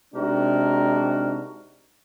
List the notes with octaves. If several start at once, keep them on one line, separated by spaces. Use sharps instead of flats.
C3 G#3 D4 D#4 F#4 A#4